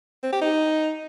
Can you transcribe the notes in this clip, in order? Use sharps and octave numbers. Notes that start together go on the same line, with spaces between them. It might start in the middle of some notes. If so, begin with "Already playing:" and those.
C4
G4
D#4